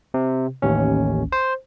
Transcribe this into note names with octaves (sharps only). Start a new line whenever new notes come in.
C3
A1 D#2 C#4
C5